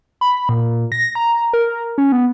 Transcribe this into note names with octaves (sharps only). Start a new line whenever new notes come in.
B5
A#2
A#6
A#5
A#4
C#4
B3